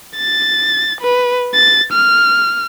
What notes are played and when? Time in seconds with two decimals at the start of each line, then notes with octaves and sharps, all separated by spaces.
0.17 A6
1.01 B4
1.54 A6
1.93 F6